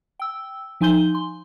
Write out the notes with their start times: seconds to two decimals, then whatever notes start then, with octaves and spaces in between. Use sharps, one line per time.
0.20 G5 E6
0.81 F3 D#4 G#5 C6 G6 G7
1.15 C6